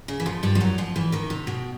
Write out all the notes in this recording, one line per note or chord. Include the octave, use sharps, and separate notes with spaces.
C#3
E3
F2 F3
G2 G3
F3
F#2 F#3
F2 F3
E2 E3
D#2 D#3
C3
B2